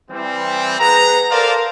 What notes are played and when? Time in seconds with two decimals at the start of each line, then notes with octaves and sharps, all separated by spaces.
0.11 E3 G3 C4
0.80 G#4 B4 F#5 A#5
1.31 A4 A#4 C5 D5 F5 A5